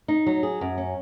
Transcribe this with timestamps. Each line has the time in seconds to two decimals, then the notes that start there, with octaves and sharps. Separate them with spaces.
0.08 D#4
0.26 F#3
0.43 G#4
0.61 F#2
0.78 C#4